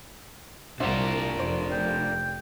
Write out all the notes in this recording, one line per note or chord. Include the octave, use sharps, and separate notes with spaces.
C2 D4 F4 A#4 C5 E5 F#5
F1 C5 D5
G5